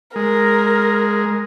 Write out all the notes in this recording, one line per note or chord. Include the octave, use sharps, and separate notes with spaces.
G#3 A#4